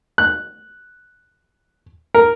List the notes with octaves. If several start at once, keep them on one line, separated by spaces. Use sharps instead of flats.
F#6
A#4